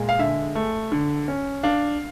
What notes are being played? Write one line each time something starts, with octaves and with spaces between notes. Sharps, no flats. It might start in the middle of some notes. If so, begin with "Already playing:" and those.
Already playing: A#2 G#3
F5
D3 E5
A3
D3
C#4
D4 F5